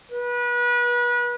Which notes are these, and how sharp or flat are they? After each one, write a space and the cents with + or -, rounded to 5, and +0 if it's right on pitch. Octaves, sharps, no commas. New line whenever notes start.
B4 -30